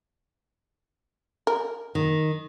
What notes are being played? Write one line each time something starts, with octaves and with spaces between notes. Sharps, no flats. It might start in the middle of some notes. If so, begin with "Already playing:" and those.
A#4
D#3